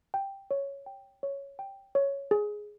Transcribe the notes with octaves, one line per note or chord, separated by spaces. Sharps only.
G5
C#5
G5
C#5
G5
C#5
G#4